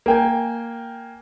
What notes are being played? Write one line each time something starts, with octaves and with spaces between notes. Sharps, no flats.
A#3 G5 G#5